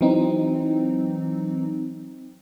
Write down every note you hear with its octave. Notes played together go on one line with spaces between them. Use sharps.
E3 F#3 C4 D#4